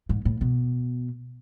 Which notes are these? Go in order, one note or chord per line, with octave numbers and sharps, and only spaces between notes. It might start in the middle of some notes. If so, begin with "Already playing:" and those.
G#2
A2
B2